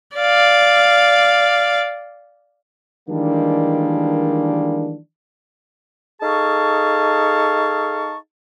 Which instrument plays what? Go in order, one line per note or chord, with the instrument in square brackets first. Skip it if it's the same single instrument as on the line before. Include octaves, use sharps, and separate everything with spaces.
[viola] D5 F5
[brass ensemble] D#3 E3 G3 G#3 A#3 D4
[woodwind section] D#4 G#4 A4 F5 A5 C#6